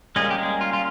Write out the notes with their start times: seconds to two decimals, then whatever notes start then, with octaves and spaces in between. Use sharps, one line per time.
0.16 G3 G#3 A#3 C#4 G#4
0.30 G4
0.38 G#3 G#4
0.61 F4
0.73 F4